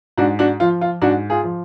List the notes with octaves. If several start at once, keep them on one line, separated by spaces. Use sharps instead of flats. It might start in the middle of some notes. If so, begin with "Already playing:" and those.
G#2 D4 F#4
D4 F#4
F3 F4
F4
G#2 D4 F#4
F4 G#4
F3